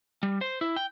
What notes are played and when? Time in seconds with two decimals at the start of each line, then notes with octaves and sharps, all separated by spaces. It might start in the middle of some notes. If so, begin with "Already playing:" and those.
0.23 G3
0.41 C5
0.61 E4
0.76 G5